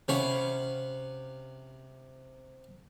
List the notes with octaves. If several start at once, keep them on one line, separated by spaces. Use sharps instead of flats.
C3 C#4 F5 F#5 B5 C#6